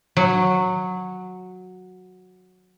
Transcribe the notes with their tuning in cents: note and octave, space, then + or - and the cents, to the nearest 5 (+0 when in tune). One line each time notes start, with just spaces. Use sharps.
F#3 -10